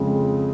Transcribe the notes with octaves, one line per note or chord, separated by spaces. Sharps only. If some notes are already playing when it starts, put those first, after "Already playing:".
Already playing: F2 C#3 G#3